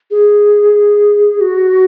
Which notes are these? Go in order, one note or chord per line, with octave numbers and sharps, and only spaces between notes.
G#4
F#4